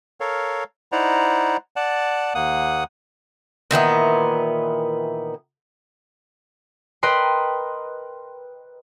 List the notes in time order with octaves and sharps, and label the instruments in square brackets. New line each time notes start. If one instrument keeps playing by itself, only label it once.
[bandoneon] A4 A#4 C#5 F5
D#4 E4 C5 D5 F#5 A#5
D5 F#5 A5
D#2 A#3 F#5 D#6
[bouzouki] A#2 D#3 E3 B3
[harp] A#4 B4 D#5 G5 C6